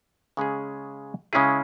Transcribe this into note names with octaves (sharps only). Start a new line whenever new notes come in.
C#3 G#3 C#4 G#4
C#3 G#3 C#4 E4 G#4